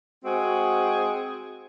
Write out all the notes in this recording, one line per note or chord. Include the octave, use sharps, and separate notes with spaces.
G#3 C4 F#4 G#4